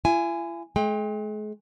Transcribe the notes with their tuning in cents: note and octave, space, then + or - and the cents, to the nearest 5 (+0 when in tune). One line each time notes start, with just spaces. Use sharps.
E4 +45 G#5 +0
G#3 +40 G5 +35